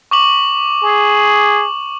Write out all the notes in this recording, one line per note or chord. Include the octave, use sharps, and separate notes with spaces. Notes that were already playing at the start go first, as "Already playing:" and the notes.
C#6 D6 F#7
G#4